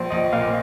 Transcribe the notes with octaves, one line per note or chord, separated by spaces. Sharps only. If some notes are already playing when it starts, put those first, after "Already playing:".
Already playing: A#1 C5
A#1 D#5
A#2 F5